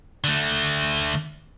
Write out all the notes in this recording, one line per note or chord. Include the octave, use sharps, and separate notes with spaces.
D3 A3